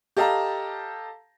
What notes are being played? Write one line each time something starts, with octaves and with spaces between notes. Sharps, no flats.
G4 A4 D#5 F5 A5 A#5